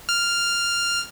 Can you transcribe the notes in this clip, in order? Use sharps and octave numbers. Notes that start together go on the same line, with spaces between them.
F6